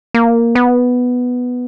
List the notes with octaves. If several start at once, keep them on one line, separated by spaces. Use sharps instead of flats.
A#3
B3